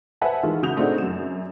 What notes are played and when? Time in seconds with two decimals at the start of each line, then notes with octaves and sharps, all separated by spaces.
0.21 B4 C5 E5 F#5 G#5 A5
0.43 D#3 E3 G#3 F4
0.63 C#3 F#4 D#6 G6 F7
0.77 A3 C4 D4 D#4 F#4 G#4
0.98 F#2 E7